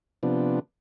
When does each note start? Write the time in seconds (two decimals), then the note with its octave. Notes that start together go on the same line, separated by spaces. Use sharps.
0.23 C3 F3 B3 D4